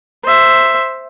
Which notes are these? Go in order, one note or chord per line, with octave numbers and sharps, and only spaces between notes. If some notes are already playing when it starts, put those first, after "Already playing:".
C5 E5